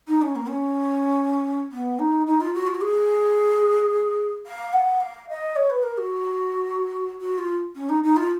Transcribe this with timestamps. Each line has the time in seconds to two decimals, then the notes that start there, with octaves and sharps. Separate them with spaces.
0.07 D#4
0.22 C#4
0.36 A#3
0.48 C#4
1.72 B3
1.99 D#4
2.27 D#4
2.41 F4
2.54 F#4
2.67 F4
2.75 F#4
2.81 G#4
4.46 F5
4.73 F#5
5.00 F5
5.29 D#5
5.56 C#5
5.70 B4
5.83 A#4
5.98 F#4
7.21 F#4
7.38 F4
7.75 C#4
7.89 D#4
8.03 D#4
8.16 F4